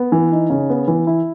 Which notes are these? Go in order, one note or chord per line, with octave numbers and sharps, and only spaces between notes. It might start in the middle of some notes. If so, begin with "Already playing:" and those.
Already playing: B3
E3
D#4
C#3
B3
E3
E4